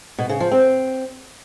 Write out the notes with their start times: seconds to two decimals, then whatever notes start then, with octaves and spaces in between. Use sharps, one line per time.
0.18 B2
0.29 C#3
0.40 F3
0.51 C4